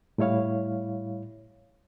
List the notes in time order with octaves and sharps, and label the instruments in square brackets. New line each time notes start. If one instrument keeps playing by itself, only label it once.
[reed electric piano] A2 G3 E4 C#5 F5